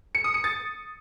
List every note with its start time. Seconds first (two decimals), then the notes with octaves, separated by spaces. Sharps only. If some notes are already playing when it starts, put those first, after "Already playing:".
0.15 C#7
0.24 D#6
0.34 C#7
0.44 A6